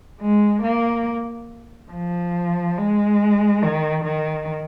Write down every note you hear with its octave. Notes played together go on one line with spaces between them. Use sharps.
G#3
A#3
F3
G#3
D#3
D#3